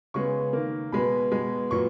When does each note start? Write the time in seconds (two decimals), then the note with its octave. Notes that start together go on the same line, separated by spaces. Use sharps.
0.14 C#3 G#3 B3 C#6
0.53 D#3 A#3
0.92 B2 G#3 B3 B5
1.32 B2 G#3 B3
1.71 A#2 F#3 B3 C#6